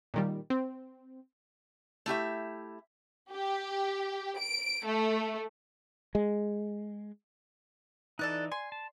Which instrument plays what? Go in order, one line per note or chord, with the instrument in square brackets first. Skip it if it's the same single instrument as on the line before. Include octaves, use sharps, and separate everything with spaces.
[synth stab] A#2 D#3 G3
C4
[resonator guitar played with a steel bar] A3 E4 G4 E5
[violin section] G4
D7
A3
[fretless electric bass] G#3
[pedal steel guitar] E3 D#4 [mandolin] A4 D5 F#6
[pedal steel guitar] G#5 [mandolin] C6
[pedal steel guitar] A5